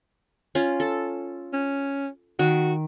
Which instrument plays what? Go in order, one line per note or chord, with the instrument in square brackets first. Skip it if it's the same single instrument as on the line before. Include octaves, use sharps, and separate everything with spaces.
[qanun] C#4 F4
A4
[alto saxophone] C#4
[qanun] D#3 [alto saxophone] F#4